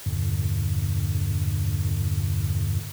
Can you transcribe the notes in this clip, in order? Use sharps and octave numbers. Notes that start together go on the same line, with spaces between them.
E2 G2 A#2 D3